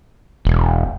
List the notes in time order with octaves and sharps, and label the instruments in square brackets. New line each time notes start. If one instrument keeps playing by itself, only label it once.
[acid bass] E1